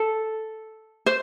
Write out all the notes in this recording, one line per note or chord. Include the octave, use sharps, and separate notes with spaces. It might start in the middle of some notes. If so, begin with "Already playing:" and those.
Already playing: A4
C5